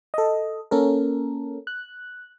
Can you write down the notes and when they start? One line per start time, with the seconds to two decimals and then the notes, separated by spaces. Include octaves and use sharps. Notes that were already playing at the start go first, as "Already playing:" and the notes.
0.14 A4 D#5
0.71 A#3 C#4 A4 A#4
1.67 F#6